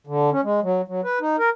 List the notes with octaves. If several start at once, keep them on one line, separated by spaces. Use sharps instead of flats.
D3
C#4
G#3
F#3
F#3
B4
D#4
A#4